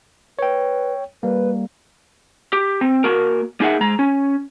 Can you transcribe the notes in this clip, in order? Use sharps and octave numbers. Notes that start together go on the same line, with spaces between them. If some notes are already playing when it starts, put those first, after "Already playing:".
B4 C#5 G5
G3 A#3 B4
G4
C4
A#3 F#4 A#4
A#3 D#4 G#4 E5 F#5
G#3 A#5
C#4